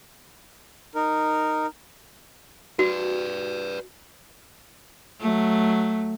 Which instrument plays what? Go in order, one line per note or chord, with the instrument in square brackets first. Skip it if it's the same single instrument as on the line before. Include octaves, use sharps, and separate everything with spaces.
[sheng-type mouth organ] D#4 A#4
[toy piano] F#4 [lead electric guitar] B4 D5
[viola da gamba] F#3 A3